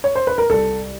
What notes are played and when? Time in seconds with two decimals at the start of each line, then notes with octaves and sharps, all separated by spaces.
0.04 C#5
0.15 C5
0.27 B4
0.38 A#4
0.50 C2 A4